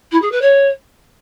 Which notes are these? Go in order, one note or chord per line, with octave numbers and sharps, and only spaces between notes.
E4
G#4
B4
C#5